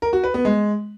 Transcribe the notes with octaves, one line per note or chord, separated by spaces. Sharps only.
A#4
F#4
B4
B3
G#3